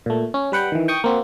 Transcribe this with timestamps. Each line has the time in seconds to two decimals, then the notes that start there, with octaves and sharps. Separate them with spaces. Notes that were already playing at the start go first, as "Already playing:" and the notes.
0.06 A#2 A3
0.34 C#4
0.52 G3 B4 F#5 G5 B5
0.72 D#3 E3
0.88 G5 C#6 D#6
1.04 A#3 C4 F#4